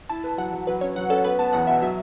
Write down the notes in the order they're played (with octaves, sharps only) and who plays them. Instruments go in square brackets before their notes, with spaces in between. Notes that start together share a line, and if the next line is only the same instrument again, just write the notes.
[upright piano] E4 [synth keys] A5
[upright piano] B4
[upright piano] F#3 [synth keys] F#5
[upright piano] F#3
[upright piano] F#3 [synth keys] B4
[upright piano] C#4 [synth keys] C#5
[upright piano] F#3 [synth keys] F#5
[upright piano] C#4 [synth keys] A4
[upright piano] B3 [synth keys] B4
[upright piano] B3 [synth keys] A5
[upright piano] E2 [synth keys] F#5
[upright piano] B2 [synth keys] E5
[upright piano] F#3 [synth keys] E5